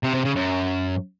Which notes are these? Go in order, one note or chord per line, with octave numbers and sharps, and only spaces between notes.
C3
C3
C#3
F#2